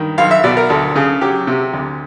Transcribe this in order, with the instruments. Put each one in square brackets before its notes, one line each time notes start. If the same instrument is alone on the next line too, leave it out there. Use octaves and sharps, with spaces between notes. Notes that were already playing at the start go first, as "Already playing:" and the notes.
Already playing: [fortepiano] G2 D#3
B1 F5
E5
B2 D5
A#4
D2 A4
C#3 G#4
F#3 G4
C3
D2